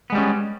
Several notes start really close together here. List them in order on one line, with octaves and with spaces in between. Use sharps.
B3 G#3 G3 C#4